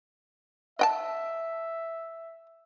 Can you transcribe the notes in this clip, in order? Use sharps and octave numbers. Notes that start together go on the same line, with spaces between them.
D#5 E5 G5 A5